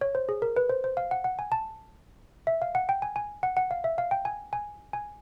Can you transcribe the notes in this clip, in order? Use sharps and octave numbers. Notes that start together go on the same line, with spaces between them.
C#5
C5
G#4
A#4
B4
C5
C5
F5
F#5
F#5
G#5
A5
E5
F5
F#5
G5
G#5
G#5
F#5
F#5
F5
E5
F5
G5
G#5
G#5
G#5